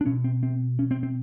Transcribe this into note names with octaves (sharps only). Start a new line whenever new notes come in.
D4
B2 C#4
C4
C4
C#4
C4
C4